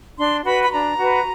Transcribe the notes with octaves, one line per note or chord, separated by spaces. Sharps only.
D4 C6
F#4 B4 B5
B5
D4 A#5
F#4 B4